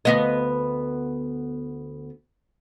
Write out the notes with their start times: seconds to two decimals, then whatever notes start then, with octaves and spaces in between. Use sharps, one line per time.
0.05 D2 B3 D#5